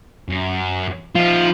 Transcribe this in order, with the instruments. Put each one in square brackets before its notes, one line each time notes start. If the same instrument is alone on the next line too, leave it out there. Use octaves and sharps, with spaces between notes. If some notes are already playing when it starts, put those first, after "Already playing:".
[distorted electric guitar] F#2
[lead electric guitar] F3 [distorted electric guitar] D#4 F4